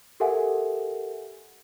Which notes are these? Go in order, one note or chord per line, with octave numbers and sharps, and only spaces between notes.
G4 A4 A#4 E5 F#5 G#5